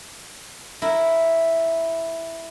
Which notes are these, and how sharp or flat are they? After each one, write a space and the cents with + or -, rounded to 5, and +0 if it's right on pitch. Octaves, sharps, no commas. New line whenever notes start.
E4 +0 A#4 +0